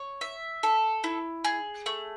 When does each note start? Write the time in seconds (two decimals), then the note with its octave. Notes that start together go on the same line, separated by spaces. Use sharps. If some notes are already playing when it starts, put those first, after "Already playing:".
Already playing: C#5
0.21 E5
0.63 A4
1.04 E4
1.44 G#4
1.86 A3